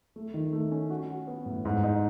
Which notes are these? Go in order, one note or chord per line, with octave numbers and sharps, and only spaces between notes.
A3
D#3
A3
C#4
F#4
F#4
B3
A2
G#2
D#4